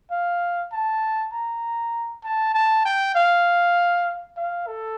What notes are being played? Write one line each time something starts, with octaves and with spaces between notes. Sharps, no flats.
F5
A5
A#5
A5
A5
G5
F5
F5
A4